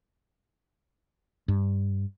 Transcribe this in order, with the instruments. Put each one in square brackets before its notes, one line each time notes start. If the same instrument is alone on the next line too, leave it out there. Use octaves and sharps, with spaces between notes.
[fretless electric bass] G2